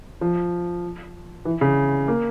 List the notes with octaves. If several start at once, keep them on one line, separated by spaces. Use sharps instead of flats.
F3
E3
C#3
A#3